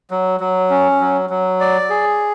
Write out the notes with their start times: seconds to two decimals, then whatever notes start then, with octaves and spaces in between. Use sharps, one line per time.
0.11 F#3
0.40 F#3
0.70 C#4
1.01 F#3
1.30 F#3
1.60 D5
1.90 G#4